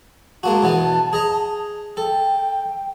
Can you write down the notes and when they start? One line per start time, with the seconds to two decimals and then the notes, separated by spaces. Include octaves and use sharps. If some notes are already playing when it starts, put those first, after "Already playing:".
0.43 G#3 A#3 F#4 A5
0.63 B2 E3 B3
1.13 G#4 D#5 A#5
1.97 A4 G5